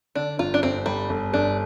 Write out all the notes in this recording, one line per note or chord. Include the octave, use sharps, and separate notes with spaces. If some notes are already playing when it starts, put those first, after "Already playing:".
D3 D4
G1 F4
D4
G1 C4
G1 G3
G1
G1 D4